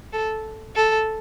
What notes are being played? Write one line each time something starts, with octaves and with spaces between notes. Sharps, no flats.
A4
A4